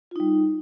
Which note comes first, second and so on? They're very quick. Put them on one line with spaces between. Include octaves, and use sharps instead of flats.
F4 D#4 G3